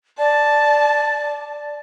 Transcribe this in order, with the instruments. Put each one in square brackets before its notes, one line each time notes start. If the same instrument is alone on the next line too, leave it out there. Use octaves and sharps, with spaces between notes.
[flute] D5 [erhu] A5